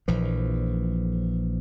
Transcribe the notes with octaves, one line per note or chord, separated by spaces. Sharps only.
A#1 E3 F3